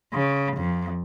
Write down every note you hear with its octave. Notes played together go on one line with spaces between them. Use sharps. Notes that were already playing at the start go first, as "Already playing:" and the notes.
C#3
F2